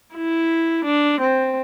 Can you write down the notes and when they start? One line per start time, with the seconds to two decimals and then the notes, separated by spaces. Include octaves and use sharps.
0.14 E4
0.84 D4
1.20 C4